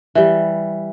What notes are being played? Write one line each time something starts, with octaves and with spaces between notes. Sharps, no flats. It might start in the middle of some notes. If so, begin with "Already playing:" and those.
E3 G3